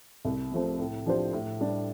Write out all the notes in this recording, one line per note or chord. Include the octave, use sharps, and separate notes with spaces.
C2
C3 F3 A3 C4
A2
F3 D4 G4 C5
A2
G3 D4 G4